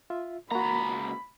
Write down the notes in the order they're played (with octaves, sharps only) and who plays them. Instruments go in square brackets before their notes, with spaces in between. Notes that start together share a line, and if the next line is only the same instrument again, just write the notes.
[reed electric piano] F4 E5
[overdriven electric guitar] C#2 A#5 [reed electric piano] A#3 F#4 [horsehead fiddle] B5